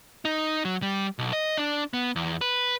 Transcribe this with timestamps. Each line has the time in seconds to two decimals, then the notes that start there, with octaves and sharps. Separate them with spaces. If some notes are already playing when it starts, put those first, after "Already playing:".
0.25 D#4
0.65 F#3
0.82 G3
1.19 B1
1.33 D#5
1.57 D4
1.93 B3
2.16 E2
2.41 B4